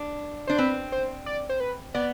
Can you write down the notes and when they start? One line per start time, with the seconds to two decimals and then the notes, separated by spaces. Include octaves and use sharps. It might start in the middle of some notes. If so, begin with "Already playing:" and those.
Already playing: D4
0.47 D4 C5
0.58 C4 B4
0.92 C5
1.26 D5
1.50 C5
1.60 B4
1.94 B3 D5